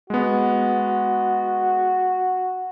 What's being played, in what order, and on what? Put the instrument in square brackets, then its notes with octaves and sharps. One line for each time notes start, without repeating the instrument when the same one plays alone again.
[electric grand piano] G#3 B3 [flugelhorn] F#4